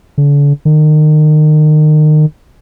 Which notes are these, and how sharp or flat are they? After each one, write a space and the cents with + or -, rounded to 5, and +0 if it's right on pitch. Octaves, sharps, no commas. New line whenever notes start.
D3 -40
D#3 -30